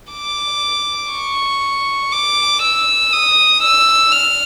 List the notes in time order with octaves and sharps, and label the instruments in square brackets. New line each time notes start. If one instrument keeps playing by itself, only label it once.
[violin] D6
C#6
D6
E6
D#6
E6
F6